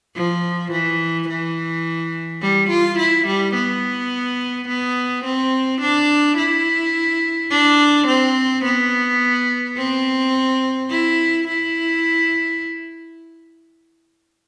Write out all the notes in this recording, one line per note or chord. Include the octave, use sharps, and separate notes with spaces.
F3
E3
E3
G3
F4
E4
G3
B3
B3
C4
D4
E4
D4
C4
B3
C4
E4
E4